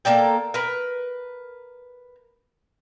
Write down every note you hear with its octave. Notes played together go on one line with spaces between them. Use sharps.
A#3 A4 D5 G5
A#4 B4